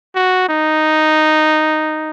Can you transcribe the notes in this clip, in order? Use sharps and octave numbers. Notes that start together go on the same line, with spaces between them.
F#4
D#4